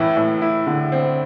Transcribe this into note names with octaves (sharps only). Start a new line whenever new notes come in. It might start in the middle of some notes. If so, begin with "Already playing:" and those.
Already playing: A2 E3 E4
A2
E4
D3
C4